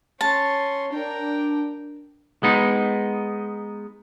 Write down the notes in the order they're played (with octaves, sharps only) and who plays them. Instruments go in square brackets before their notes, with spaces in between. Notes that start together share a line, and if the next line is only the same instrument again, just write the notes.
[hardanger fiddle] C#4 C6 [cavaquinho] A5
[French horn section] D4 [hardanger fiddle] A#4 G5
[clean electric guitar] G#3 B3 D#4